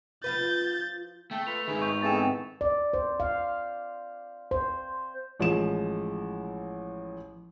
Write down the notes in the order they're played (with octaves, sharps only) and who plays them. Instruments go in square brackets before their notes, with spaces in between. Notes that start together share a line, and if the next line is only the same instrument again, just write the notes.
[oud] F3 F4 B4 [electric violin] G6 A6
[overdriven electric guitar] A3 [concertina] A4 G5
[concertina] F4 B4 [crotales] F7
[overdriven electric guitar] G#2 D#3 [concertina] G#4 B4 E5
[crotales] C#6 G6 F7
[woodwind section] E3 B3 C4 [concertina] G#4 A4 [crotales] A6 E7
[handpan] D5
C5
F5
C5
[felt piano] A1 F3 G#3 E7